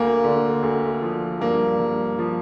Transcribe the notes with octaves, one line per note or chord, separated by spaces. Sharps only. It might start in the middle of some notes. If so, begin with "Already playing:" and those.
Already playing: D2 A#3
D3
D2
F3
G2 A#3
G2
F3